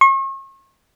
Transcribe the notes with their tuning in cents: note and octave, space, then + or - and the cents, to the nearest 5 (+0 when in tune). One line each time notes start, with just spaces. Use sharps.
C#6 -40